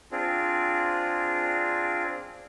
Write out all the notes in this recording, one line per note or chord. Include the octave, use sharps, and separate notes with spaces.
C4 D4 F4 G#4